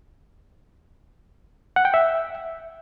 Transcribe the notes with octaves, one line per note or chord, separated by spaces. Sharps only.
F#5
G5
E5